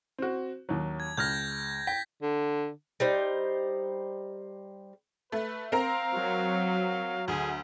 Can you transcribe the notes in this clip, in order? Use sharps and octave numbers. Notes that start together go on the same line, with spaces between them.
C4 F#4
D#2 F#3
G#6
C#2 F6 G6 G#6 A#6
G5 B6
D3
G3 D#4 C5
A3 B4
C4 A#4 F5 A#5
F#3
D2 G#4